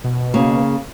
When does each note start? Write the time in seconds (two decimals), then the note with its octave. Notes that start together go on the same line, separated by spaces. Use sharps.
0.04 B2
0.34 C#3 A#3